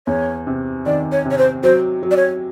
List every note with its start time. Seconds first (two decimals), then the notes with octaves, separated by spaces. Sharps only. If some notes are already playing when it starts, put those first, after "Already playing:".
0.07 E2 C#5
0.47 C3
0.86 D#3 D5
1.12 C#5
1.26 C3
1.31 C#5
1.38 C5
1.63 F#3 C5
2.03 F#3
2.11 D5
2.17 C#5